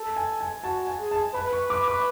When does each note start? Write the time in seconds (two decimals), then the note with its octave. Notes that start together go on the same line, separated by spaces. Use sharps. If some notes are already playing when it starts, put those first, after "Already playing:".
Already playing: A4
0.16 G#5
0.41 G#5
0.64 F#4 A5
0.87 G#5
0.99 G#4
1.11 A5
1.34 B4 B5
1.53 C#6
1.70 D6
1.88 D6